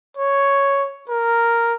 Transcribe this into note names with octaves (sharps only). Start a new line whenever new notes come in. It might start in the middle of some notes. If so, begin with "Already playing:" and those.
C#5
A#4